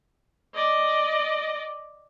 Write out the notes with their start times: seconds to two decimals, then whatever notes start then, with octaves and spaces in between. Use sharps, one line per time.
0.54 D5 D#5